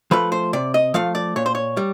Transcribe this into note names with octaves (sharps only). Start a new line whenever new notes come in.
F3 A3 B4
C5
C3 D5
D#5
F3 A3 F5
D5
A#2 C#5
C5
C#5
G3